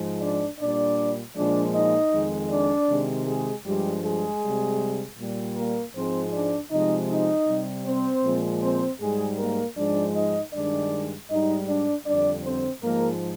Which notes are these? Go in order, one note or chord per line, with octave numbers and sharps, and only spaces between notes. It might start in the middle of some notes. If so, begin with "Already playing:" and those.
Already playing: G#2 F3 G#3
D4 D5
A#2 G3 D4 D5
A#2 F3 G#3 D4 D5
D#4 D#5
F2 D#3 G#3
D4 D5
C3 D#3 G#3
G#3 G#4
G2 F3 G3 G#3 G4
G#3 G#4
C3 G3
A#2 G3
A#3 A#4
G#2 F3 G#3 C4 C5
D4 D5
C3 F3 G#3 D#4 D#5
D#4 D#5
C3 G3
C4 C5
A#2 F3 G#3
C4 C5
G#2 G3 G#3 G#4
A#3 A#4
G#2 F3 G#3 D4 D5
D#4 D#5
G2 D#3 G#3 D4 D5
G#2 G3 D#4 D#5
D4 D5
F2 D3 G3 D4 D5
C4 C5
G#2 F3 G#3 A#3 A#4